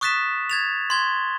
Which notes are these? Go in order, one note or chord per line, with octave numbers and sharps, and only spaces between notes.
C#6 D#6 F#6 A6 B6 E7
G#6 A6 F7
C6 G#6 G7